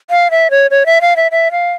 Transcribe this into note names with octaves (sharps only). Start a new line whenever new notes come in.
F5
E5
C#5
C#5
E5
F5
E5
E5
F5